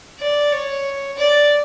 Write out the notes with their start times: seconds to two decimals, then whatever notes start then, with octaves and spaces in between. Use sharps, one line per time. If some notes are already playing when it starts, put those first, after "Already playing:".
0.20 D5
0.52 C#5
1.18 D5